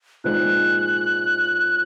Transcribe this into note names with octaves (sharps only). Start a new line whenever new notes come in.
A#2 F3 G#3 C4 D#4 F#6